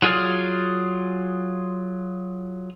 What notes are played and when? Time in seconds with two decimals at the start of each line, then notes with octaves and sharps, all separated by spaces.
0.02 F#3 F4 G#4 D5 F6